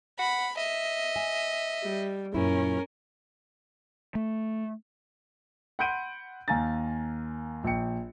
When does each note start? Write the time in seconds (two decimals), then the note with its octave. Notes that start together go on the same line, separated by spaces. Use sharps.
0.19 F#5 B5
0.57 D#5 E5
1.16 G#5
1.84 G3
2.34 F#2 A#2 C#4 E4 A#4
4.15 A3
5.79 F#5 B5 C6 G6 D7 D#7
6.48 D#2 F5 G#5 A#5 A6
7.64 A#1 G5 C#7